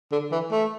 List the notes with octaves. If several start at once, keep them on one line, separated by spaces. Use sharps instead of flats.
D3
E3
A3